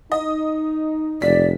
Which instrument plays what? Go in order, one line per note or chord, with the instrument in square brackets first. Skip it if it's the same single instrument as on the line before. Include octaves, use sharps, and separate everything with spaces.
[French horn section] D#4 [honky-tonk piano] D#5
[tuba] F1 [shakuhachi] D5 [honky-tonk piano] B6